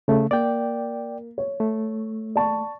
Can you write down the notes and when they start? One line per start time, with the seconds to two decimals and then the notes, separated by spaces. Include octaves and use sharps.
0.08 C#3 A3
0.31 A#3 D5 G5
1.38 C#5
1.60 A3
2.36 D5 A5 C#6